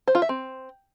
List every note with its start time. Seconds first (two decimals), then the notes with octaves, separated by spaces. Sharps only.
0.08 C5
0.15 F4
0.22 E5
0.29 C4